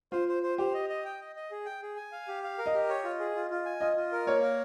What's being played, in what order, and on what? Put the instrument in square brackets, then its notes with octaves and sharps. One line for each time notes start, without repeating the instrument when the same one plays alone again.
[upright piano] F4 [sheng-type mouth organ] C5
[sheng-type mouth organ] C5
C5
[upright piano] G4 [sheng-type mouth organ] C5
[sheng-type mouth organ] D#5
D#5
G5
D#5
D#5
G#4
G5
G#4
G#5
F5
G4
F5
A#4
[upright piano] D#5
[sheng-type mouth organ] G4
C#5
F4
G#4
F4
F4
G#5
[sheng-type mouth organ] F4 [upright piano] D#5
[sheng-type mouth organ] F4
A#4
[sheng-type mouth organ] A#3 [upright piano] C#5
[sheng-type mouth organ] A#4